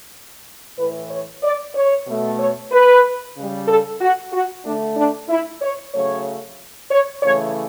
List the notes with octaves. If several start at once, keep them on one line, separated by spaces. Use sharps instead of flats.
A2 E3 A3 B4
C#5
D5
C#5
B2 A3
C#5
B4
C#3 G3
A4
F#4
F#4
D3 A3 D4
D4
E4
C#5
C#3 F#3 A3 C#5
C#5
C#3 E3 A3 C#5